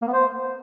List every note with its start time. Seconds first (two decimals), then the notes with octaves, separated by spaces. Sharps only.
0.02 A#3
0.07 B3
0.13 C5